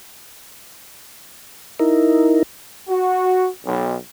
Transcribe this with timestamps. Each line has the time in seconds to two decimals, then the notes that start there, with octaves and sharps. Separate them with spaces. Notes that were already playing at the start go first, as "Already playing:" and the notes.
1.79 D#4 E4 A#4
2.89 F#4
3.66 B1